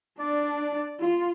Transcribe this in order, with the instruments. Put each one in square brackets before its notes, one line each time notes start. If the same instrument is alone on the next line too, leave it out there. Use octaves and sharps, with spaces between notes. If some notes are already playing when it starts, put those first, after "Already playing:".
[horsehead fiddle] D4 [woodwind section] D5
[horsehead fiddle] F4